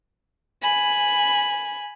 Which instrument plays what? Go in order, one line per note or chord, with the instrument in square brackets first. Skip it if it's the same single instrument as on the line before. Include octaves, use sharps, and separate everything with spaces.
[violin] G#5 B5